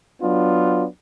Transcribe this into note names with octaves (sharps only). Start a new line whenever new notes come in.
F#3 B3 D4 F4